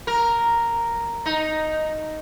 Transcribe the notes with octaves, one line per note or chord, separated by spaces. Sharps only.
A#4
D#4